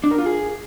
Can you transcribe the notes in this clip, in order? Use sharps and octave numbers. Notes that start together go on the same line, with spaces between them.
D4
A#4
F4
G#4